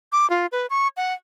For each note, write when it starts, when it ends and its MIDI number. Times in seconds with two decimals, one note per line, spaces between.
0.12 0.29 86
0.30 0.46 65
0.52 0.67 71
0.70 0.88 85
0.97 1.14 78